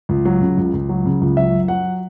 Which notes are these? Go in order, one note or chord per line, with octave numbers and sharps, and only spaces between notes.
C#2
F#3
C#3
C#2
C#2
F#3
C#3
C#2
F#3 E5
F#2
F#3 F#5